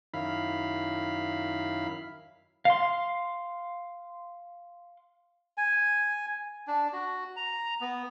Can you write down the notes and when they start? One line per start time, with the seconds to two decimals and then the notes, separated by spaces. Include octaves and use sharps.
0.14 F#2 D#3 E4 F5 B5
2.65 F5 C6
5.57 G#5
6.67 D4
6.93 F#4
7.36 A#5
7.81 B3